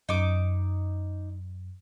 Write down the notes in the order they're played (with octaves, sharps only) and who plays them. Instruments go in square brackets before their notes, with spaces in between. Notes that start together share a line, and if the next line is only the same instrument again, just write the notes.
[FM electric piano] F#2 [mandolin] D#4 D6